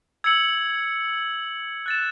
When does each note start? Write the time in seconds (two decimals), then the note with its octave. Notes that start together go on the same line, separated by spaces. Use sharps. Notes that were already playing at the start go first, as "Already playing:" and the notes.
0.24 E6 G#6 C#7 F#7
1.86 F#6 A6 E7